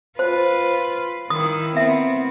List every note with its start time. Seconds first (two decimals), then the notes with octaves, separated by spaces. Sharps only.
0.19 F4 B4 C5
1.30 D#3 E4 D#6
1.77 B3 C4 E5